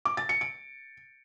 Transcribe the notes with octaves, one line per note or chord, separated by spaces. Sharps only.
D6
A6
C#7
D7